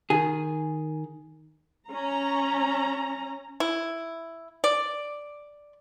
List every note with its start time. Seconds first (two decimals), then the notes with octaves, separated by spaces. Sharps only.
0.10 D#3 G#4
1.90 C#4 A#5
3.60 E4
4.64 D5